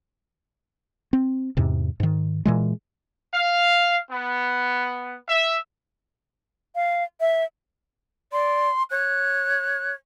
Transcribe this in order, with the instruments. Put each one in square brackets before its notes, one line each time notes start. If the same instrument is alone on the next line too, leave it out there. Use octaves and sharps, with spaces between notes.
[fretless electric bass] C4
E2 G#2 C3
G#2 D#3
A#2 E3 G#3
[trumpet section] F5
B3
E5
[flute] F5
E5
[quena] D5 [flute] C6
[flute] C#5 [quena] F#6